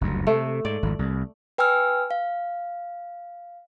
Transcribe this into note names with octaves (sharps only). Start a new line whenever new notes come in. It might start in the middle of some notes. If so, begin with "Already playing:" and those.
F#1 D2 G2
C3 A3
G#2 D5
G#1 F2
C2
B4 G5 G#5 E6 F6
F5